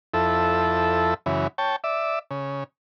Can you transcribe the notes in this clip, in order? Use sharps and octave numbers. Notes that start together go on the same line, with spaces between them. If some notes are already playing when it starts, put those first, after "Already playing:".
F2 E4 A4
F#2 C#3 E3
C#5 G5 A5
D5 E5
C#3